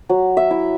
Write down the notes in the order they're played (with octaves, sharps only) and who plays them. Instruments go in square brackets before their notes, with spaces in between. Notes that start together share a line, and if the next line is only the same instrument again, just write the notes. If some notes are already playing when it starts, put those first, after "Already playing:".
[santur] F#3
E5
E4